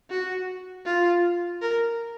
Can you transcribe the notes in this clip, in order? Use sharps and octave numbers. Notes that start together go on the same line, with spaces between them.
F#4
F4
A#4